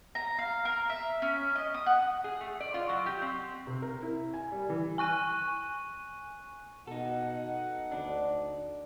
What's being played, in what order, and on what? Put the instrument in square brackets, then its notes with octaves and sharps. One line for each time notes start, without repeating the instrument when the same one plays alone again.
[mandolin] A#5
F5
A#4
E5
C#4
D#5
D#6
F#5
[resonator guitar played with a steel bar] G#4
A3
D5
F4
F#3
G4
C4
[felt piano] C3
A#4
E4
G#5
G3
E3
[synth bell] G#5 C#6 F#6 D#7
[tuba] B2 [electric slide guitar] D#4 A4 [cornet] F#5
[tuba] D2 [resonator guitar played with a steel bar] D4